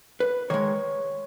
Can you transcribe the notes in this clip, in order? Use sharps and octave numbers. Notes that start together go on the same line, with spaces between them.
B4
D#3 G#3 C#5